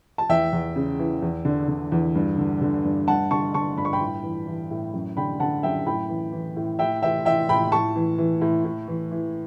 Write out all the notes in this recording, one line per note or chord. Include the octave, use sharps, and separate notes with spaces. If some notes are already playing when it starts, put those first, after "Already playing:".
A5
E2 E5 G5
E2
C#3
E3
E2
D3
D3
E2
G2
D3
D3
G2
G2 F#5 A5
D3 A5 C#6
D3 A5 C#6
G2 B5
C#6
G5 B5
A2
E3
E3
A2
F#2
D3 G5 B5
D3 F#5 A5
F#2 E5 G5
A2 G5 B5
E3
E3
A2
A2 E5 G5
E3 E5 G5
E3 E5 G5
A2 G5 B5
A2 A5 C#6
E3
E3
A2
A2
E3
E3